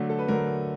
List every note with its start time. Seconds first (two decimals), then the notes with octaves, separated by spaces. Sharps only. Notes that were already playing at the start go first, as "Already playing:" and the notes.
Already playing: D3 F#3 A3
0.10 A4
0.19 B4
0.28 D3 F#3 A3 A#4